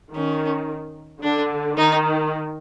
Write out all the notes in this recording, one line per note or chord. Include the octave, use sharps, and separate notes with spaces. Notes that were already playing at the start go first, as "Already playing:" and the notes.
D#3 C#4
D3 D4
D#3 D#4